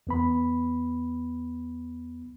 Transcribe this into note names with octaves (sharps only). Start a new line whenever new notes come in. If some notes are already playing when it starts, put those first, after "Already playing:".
E2 B3 B5